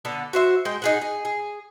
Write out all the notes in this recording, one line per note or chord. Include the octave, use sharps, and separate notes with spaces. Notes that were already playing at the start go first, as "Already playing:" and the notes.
D3 B3 A4
F#4 C5 E5
G#3 G5
D#4 G#4 F#5
G#4
G#4